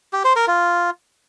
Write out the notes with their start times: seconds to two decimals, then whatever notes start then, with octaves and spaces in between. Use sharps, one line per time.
0.13 G4
0.25 C5
0.36 A#4
0.47 F4